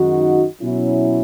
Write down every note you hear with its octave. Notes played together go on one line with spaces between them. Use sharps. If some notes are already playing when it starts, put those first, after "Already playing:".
Already playing: F#2 D#3 G#3 D#4 F#4
B2 F#3 C#4 E4